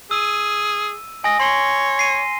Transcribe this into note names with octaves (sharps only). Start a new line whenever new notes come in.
G#4 E6 D#7
D#5 G#5 A#6
C#5 C6 C7 G7
C7 D#7